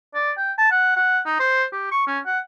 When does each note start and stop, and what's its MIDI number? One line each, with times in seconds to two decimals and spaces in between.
0.15 0.32 74
0.38 0.52 79
0.58 0.70 81
0.71 0.92 78
0.96 1.20 78
1.26 1.37 63
1.40 1.64 72
1.72 1.90 67
1.91 2.04 85
2.07 2.19 61
2.26 2.39 78